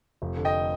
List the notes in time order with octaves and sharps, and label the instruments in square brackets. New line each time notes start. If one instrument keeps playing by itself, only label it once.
[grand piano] F1
D3
D#5 G5